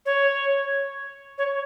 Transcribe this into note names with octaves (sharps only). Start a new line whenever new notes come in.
C#5
C#5